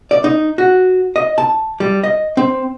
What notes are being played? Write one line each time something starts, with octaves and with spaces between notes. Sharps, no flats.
D5
D#4
F#4
D#5
A5
G3
D#5
C4